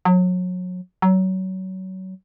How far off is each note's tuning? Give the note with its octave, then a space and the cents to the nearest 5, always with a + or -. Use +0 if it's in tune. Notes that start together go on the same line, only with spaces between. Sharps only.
F#3 -30
F#3 +25